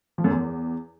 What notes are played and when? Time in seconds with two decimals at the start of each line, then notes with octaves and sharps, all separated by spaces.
0.18 F3
0.24 F#2
0.31 E2